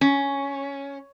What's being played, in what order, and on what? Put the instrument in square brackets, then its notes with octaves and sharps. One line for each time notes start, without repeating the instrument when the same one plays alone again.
[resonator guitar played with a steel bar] C#4